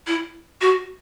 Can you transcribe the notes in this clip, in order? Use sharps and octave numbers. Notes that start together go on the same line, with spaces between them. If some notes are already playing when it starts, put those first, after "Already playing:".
E4
F#4